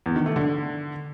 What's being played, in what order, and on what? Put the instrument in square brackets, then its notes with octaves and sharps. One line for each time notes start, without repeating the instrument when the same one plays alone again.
[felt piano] E2
D#3
A3
D3